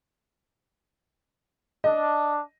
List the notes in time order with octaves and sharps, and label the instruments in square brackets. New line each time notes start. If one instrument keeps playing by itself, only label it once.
[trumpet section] D4 [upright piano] D#5